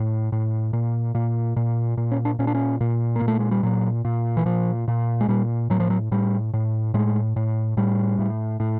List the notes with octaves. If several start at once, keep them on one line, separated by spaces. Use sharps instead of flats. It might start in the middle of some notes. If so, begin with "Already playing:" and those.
Already playing: A2
A2
A#2
A#2
A#2
A#2
C#4
D4
A#2 C#4
D4
C#4
A#2
A#3
A#2
A3
G#3
G3
A#2 F#3
A#2
E3
A#2 F3
A#2
G#3
A#2 G3
A2 F#3
F3
F#3
A2 G3
A2
A2 G#3
A2
A2 G3
A2
A2